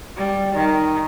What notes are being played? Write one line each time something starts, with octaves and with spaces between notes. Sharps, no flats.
G3
D#3